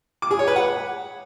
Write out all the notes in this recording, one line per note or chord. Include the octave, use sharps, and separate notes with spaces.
D6
G#4
C#5
B4
F#5